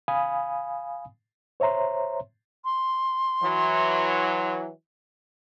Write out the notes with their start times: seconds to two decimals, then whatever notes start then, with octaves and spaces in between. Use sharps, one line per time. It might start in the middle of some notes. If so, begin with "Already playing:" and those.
0.08 F5 G#5 B5 D#6
1.60 C5 C#5 E5 A#5 C6
2.65 C6
3.42 E3 F#3